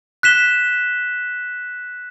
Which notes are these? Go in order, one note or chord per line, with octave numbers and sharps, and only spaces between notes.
F#6 B6 E7 G7